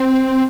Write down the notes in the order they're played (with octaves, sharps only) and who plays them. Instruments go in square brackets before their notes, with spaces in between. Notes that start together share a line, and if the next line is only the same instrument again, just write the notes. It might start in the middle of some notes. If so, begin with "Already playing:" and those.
Already playing: [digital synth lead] C4